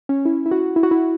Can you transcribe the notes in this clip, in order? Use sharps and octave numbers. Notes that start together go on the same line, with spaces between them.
C#4
E4
E4
F#4
E4
F#4
E4